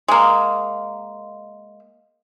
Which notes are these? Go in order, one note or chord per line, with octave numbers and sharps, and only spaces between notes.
G#3 A#3